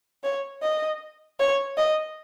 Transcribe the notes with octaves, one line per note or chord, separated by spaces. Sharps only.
C#5
D#5
C#5
D#5